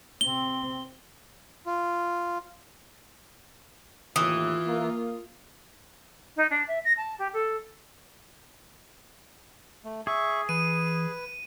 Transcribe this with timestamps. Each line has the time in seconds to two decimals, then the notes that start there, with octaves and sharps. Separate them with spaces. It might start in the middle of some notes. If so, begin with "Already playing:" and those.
0.21 C3 C4 G7
1.66 F4
4.16 D#2 A2 E3 F4 D#6
4.66 A#3
6.36 D#4
6.50 D4
6.67 E5
6.84 A#6
6.97 A5
7.18 G4
7.33 A4
9.84 A3
10.07 G#4 E5 C#6
10.49 E3 B4 D#7